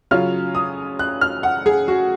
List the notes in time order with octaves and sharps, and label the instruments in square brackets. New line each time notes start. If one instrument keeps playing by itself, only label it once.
[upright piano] C#3 F#3 C#4 F4 F6
D#6
F#6
F6
F#5
G#4
F#4